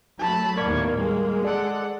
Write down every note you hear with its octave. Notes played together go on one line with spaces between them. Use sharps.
F#3 A3 A5 B5
D#2 A2 A#3 B3 D5 C#6 G#6
G3 G#3
A4 D5 F#5